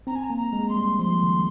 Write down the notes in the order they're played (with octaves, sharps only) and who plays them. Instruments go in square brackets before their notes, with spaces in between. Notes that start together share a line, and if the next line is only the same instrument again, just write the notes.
[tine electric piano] C4 [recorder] A#5
[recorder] G#5
A#5
[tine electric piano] A#3
[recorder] A#5
[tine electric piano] G#3
[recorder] C6
[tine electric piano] G3
[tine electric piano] F3 [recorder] C6
[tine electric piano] D#3